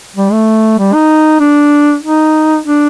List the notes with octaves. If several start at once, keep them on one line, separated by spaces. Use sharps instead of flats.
G3
A3
G3
D#4
D4
D#4
D4